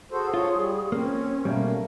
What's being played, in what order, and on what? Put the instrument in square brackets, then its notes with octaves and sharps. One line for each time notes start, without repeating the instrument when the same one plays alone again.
[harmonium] F#4 A4 C5 [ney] G#4
[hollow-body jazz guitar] F4 [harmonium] C#5
[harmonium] G3
[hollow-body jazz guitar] A#3 [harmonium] C4 [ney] C#4
[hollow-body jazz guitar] B2 G3 [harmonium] A3 A#3